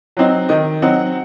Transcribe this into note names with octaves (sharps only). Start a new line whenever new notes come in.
F#3 C4 D#4
D#3 D#5
F#3 C4 D#4 F#5